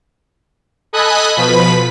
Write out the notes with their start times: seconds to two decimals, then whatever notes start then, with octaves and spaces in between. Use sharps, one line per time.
0.93 A4 D#5 G#5 B5 D#6 F#6
1.37 B2 F3 B4 B5 B6